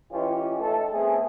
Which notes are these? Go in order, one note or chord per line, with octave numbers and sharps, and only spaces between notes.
E3 G#3 C#4 F4 G4
A3 D#4 A4
A3 B3 C4 G#4